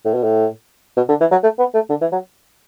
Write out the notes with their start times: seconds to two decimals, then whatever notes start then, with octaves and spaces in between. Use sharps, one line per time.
0.05 A2
0.14 B2
0.24 A2
0.97 B2
1.09 D3
1.20 E3
1.31 F#3
1.43 A3
1.59 B3
1.74 A3
1.89 D3
2.01 E3
2.12 F#3